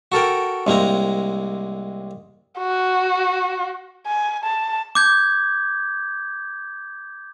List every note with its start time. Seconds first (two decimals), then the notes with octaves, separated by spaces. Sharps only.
0.12 F#4 A4 A#4 G5
0.67 C2 G#3 A#3 C4 A#5
2.59 F#4
4.07 G#5
4.44 A5
4.95 D6 G6 G#6